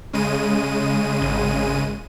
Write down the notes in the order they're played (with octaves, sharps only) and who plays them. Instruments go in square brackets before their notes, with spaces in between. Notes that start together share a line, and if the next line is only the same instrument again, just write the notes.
[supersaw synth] C#3 G#3 D#7
[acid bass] G#1